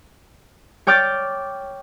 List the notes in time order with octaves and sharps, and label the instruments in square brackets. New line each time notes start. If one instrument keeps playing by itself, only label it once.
[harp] C#5 G5 D6 F6 G6 A6